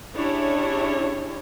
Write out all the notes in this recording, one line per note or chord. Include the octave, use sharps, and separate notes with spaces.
C#4 D4 E4 G4 G#4 C#5